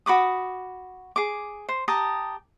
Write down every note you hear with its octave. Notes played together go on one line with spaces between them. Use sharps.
F#4 B5 D6 D#6
G#4 D6
C5
G4 A5 A#5 D#6